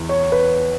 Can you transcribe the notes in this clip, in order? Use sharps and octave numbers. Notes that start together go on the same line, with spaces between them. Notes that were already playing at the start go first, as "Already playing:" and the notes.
Already playing: E2
C#5
B4